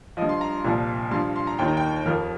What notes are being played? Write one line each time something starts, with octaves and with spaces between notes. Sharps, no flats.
F3 D#5
G2
C6
A#5
C2 A#2 F3
G2 F3 C6
C6
A#5
D#2 D#3 G5
A#5
G5
F2 F3 A#4